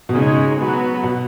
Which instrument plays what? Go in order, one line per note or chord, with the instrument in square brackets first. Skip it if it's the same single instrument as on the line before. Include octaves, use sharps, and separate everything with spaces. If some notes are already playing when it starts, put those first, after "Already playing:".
[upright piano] B2
[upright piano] C#3 [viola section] G#3 D#4 G#4 C#5
[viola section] F#3 B3 F#4 B4
[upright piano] B2